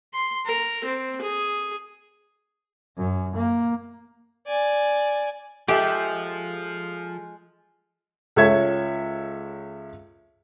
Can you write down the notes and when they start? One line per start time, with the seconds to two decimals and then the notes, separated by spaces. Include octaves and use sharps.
0.13 C6
0.46 A#4
0.84 C4
1.21 G#4
2.97 F#2
3.36 A#3
4.46 D5 G#5
5.68 F3 G#3 G4 A4 E5
8.36 C#2 A4 C#5 E5 G#6